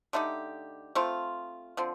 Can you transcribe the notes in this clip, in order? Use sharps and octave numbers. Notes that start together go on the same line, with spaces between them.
D3 A3 D#4 G4
A3 C4 F4
D3 F3 C4